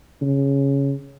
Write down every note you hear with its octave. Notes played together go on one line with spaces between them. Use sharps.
C#3